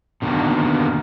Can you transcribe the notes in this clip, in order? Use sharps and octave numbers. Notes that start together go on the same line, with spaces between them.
B2 D3 D#3 A#3